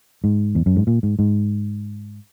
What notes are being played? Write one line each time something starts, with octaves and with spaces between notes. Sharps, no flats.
G#2
E2
F#2
G#2
A#2
G#2
G#2